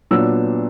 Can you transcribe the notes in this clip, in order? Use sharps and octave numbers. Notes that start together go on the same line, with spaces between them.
A#2 F#3 B3 D4 E6